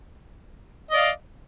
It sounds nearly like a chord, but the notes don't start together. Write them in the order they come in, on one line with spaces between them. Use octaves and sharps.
D#5 D5 F5